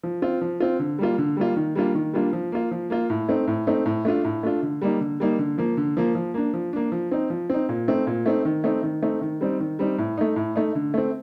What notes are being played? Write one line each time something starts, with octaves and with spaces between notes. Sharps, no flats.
F3
C4 F4
F3
C4 F4
D3
G3 A#3 F4
D3
G3 A#3 F4
D#3
G3 A#3 D4 F4
D#3
G3 A#3 D4 F4
F3
A#3 F4
F3
A#3 F4
A2
A3 C4 D#4
A2
A3 C4 D#4
A2
A3 D4 F4
A2
A3 D4 F4
D3
G3 A#3 D#4
D3
G3 A#3 D#4
D3
F3 A#3
D3
F3 A#3
F3
A#3 D4
F3
A#3 D4
F3
C4 D#4
F3
C4 D#4
A#2
A3 C4 D#4
A#2
A3 C4 D#4
D#3
A3 C4 D#4
D#3
A3 C4 D#4
D#3
G3 C4 D#4
D#3
G3 C4 D#4
A2
A3 D#4
A2
A3 D#4
D3
A3 C4